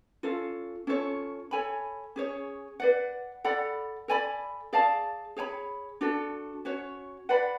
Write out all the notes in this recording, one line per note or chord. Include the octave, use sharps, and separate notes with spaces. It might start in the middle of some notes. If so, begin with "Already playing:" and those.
C#4 F4 A4 F5
C#4 F4 A4 C#5
A4 C#5 G#5 B5
C#4 G#4 C#5
B4 D5 F#5
A4 D5 F#5 B5
A4 D5 G#5 B5
G#4 D5 F5 A5
G#4 C#5 G#5 B5
D4 F#4 A4
C#4 F#4 C#5
B4 D5 F#5 B5